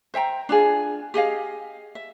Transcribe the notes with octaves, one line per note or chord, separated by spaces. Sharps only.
C5 E5 G5 A#5
D4 F4 G#4
G4 G#4 D#5 F5
E5